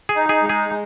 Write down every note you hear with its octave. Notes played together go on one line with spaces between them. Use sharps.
G#4
D#4
G#4
G#3
G#4
G#3